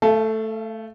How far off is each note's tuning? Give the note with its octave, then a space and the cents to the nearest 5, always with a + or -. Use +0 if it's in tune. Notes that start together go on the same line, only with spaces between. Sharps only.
A3 +0 F5 -40 A5 -20